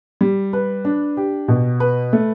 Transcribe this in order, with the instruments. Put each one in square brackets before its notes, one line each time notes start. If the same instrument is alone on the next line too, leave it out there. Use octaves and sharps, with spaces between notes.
[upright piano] G3
B4
D4
G4
B2
B4
A3